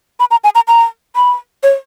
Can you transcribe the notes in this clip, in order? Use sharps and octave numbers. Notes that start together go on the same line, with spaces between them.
B5
A#5
G#5
A#5
A#5
B5
C#5